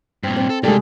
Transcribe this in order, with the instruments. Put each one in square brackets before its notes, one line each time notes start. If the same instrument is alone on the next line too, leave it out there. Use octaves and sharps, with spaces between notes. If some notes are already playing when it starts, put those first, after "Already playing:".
[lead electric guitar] G2 A#2 [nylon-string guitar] C4
[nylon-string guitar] C4
[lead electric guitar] A4
[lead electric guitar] C3 D5 [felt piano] G3 G#3 [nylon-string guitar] A#3 G4 A4